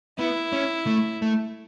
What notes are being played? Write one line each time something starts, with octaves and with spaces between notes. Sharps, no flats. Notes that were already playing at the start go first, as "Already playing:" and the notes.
B3 E4
C#4
A3
A3